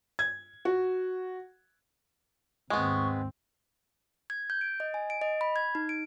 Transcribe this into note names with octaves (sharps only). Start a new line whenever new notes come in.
G#6
F#4
D#2 G#2 G#3 B3 C4 C#6
G#6
G6
D7
D#5
G#5
D7
D#5
B5
G#6
D#4
D7